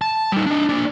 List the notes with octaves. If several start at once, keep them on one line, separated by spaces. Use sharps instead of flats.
A5
G3 D#4
D4 D#5
A#3 D4